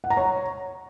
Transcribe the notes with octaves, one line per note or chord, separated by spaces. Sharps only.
F#5
A#5
C#5